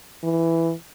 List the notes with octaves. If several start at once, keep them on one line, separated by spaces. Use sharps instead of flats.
E3